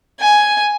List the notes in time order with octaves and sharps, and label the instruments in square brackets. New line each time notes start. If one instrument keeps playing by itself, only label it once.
[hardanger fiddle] G#5